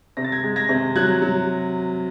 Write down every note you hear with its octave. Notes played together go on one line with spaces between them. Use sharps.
C3 A#6
A6
G#6 A#6
G#3
G#6 A#6
C3
F#3 F#6 G#6
F#3